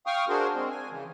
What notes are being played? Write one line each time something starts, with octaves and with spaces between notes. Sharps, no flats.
F5 G5 C#6 D#6 F6
D4 F#4 G#4 A#4 C5 C6
G#3 C4
G#5
C#3 E3